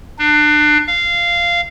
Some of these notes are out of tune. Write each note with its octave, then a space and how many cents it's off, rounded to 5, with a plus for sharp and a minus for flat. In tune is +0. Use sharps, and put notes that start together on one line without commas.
D4 +30
F5 -15